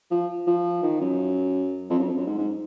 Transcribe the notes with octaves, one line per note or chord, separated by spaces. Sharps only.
F3
F3
D#3
F#2
F2
F#2
F2
F#2
G#2
G#2